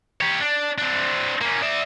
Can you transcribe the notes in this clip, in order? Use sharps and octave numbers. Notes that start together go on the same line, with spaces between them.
G4 C#5
D4
C4 D4
A#3 C#4
D5 E5